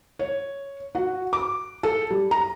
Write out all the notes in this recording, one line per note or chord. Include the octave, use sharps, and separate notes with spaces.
C#5
F#4
D6
A4
G3
A#5